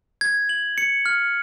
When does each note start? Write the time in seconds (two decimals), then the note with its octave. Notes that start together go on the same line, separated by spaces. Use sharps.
0.21 G#6
0.49 F#7
0.78 C#7
1.06 F6